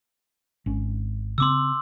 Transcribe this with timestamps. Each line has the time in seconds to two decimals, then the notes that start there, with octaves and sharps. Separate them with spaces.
0.66 G#1 C#4
1.38 C#3 C4 C6 D6 E6